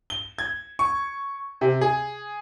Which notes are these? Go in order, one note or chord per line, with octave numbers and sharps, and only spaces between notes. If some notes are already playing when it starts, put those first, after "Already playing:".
G7
G#6
C#6
C3
G#4